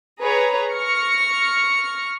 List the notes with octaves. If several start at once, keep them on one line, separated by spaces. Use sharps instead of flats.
G#4 B4 C#5 A#5
C#6 F6 A#6 C#7